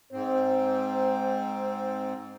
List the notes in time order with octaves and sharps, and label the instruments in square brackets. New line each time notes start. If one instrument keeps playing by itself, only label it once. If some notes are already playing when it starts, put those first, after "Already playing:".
[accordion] G#2 C4 [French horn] C5